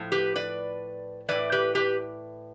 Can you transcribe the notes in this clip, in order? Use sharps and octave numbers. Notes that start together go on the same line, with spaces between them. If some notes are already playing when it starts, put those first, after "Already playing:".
Already playing: A2 F3
G4 B4
B4 D5
A2 E3 B4 D5
G4 B4
G4 B4